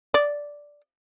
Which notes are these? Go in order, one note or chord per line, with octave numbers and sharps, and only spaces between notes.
D5